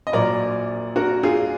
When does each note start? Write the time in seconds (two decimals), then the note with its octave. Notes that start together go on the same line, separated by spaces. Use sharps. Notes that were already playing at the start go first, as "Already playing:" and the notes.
0.07 D#5
0.13 A#1 A#2 F#3 A#4 D5
0.96 F#4 A#4
1.23 F4 G#4